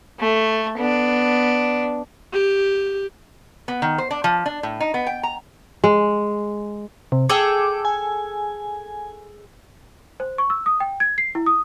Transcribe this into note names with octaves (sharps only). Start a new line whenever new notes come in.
A3
B3 D4
G4
B3
D#3
C5
D4
F3
D4
A2
D#4
B3
G5
A#5
G#3
C3
G#4 A4 G5 D6
G#5
C5
C#6
E6
D#6
G5
G#6
C7
E4
D#6